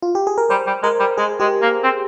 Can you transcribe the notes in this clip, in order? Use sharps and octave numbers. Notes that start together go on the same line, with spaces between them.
F4
G4
G#4
A#4
G3 C5
G3
G#3 A#4
G3
G#3 G#4
G#3 G4
A#3
C4